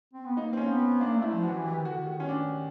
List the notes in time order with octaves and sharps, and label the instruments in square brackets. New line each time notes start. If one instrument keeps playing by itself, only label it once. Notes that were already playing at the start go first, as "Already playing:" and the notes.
[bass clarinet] C4
B3
[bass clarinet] A#3 [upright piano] D#4
[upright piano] C4
C#4
[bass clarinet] B3
[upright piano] C4
[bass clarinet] A#3 [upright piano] D4
[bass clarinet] A3
[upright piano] E4
[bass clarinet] F3
[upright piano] F#4
[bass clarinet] E3
[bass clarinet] E3 [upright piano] G4
[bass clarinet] D#3
[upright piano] F#4
[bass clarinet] D3
[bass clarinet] D#3 [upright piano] F#4
[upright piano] C#4
D4